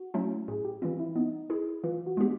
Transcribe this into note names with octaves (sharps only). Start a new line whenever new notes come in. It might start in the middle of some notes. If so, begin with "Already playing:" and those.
Already playing: F#4
F#3 A3 C#4 E4
A2 G#4
G4
E3 G3 C4 F4
E4
B3 D#4
E4 G#4
E3 F4
F#4
G#3 B3 D4 G4